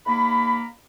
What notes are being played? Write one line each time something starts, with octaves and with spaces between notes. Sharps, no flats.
G#2 A#3 A#5 B5